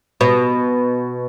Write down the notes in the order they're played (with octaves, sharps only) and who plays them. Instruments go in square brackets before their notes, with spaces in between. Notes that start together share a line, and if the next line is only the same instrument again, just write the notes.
[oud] B2